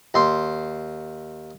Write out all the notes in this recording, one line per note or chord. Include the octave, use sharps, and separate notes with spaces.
D#2 C6